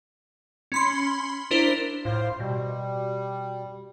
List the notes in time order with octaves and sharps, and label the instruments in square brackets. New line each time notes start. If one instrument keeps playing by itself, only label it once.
[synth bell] C#4 B5 C6
D4 E4 A#4 C5
[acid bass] A2 [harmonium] F4 C5
[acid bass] B2 [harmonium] G3